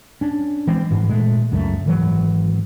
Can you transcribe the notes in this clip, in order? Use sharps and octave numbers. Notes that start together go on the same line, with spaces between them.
C#4 D4
E3 G#3 C4
G1 G#2 E3
A#2 G#3 A3
C#2 F#2 F3 A3
G#1 E3 F#3